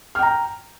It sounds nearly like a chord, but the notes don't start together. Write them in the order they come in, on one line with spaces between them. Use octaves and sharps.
F6 G5 A#5